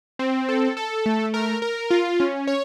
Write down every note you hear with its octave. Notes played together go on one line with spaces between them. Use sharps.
C4
A4
A4
A3
A#4
A#4
F4
C#4
C#5